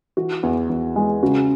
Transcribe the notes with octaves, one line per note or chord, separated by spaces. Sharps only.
E3 F#4
E2
E2
G#3
C#3 F#4